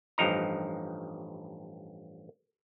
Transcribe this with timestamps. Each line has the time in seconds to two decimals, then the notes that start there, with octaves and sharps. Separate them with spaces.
0.18 A1 G2 F3 D#4 A#5